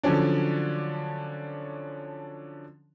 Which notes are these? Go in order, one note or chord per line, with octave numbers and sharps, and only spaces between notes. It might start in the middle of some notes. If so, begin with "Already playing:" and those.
D3 F3 F#3 C#4 D4